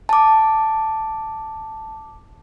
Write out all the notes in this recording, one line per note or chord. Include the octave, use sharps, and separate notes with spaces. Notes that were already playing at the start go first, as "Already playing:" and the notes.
A5 D6